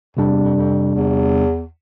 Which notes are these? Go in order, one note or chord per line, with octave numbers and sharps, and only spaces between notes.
F2 C3 G3 D4
E2
F2
F2
E2